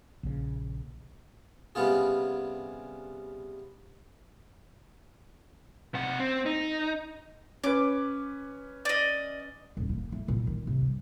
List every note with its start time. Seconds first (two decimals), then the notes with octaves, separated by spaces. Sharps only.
0.23 A#1 C#3
1.75 C3 G3 B3 C#4 F4 G#4
5.95 C3 F#5
6.19 C4
6.46 D#4
7.64 C#4 B4 D6
8.85 D5 D#5
9.77 D#1
9.89 A#2
10.12 A3
10.28 A#2
10.47 D#3
10.67 C3
10.81 G2